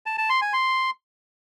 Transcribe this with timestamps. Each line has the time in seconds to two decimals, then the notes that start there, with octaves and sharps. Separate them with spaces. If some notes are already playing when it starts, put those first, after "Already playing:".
0.06 A5
0.18 A5
0.30 C6
0.41 G#5
0.53 C6